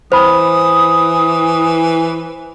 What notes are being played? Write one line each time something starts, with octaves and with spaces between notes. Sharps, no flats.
E3 C5 B5 D#6